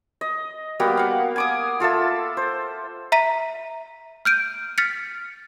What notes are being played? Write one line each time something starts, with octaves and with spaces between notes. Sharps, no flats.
D#5
G3 A#3 B3 F#4
F5 F#5
G#5 D6 D#6
F4 A4 E5 A5
C5
E5 A#5 B6 D#7
F6 G6 D7 D#7
F6 A6 B6 C#7